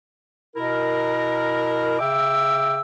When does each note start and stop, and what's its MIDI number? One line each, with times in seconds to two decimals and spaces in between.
0.56 1.96 47
0.56 1.96 64
0.56 1.96 70
1.99 2.79 49
1.99 2.79 76
1.99 2.79 79
1.99 2.79 86
1.99 2.79 88